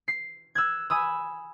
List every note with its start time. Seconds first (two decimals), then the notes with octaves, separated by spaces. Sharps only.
0.08 C7
0.55 E6 F#6 G#6
0.90 G#5 B5 D#6 E6